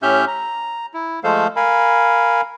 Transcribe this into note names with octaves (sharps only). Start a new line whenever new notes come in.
A2 C#4 G4 E5 F6 G6
A#5
E4
F3 G#3 A3 A4 C5 F5
A#4 F5 G#5 B5